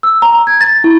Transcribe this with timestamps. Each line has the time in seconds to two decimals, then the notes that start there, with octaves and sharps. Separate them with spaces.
0.03 E6
0.22 A#5
0.47 G#6
0.61 A6
0.84 E4